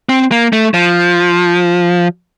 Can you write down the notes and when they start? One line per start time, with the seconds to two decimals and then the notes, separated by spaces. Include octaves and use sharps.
0.09 C4
0.32 A#3
0.53 A3
0.74 F3